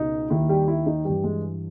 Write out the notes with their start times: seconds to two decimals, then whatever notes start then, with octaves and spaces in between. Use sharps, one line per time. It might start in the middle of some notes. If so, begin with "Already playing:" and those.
Already playing: C#2 B2 D#4
0.30 D#2 D#3 E4
0.49 G3 G4
0.68 E4
0.86 D#4
1.05 G2 E3 G3 G4
1.23 G#3 G#4